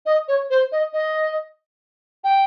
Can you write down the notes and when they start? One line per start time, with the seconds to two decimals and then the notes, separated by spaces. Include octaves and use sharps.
0.06 D#5
0.28 C#5
0.50 C5
0.72 D#5
0.93 D#5
2.24 G5